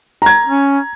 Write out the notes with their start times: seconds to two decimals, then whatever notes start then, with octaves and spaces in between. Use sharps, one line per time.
0.22 A#5 G#6
0.47 C#4